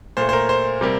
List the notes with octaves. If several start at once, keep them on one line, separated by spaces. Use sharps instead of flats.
A#2 A3 C5
C5
A#4
C5
C3 G3 A#3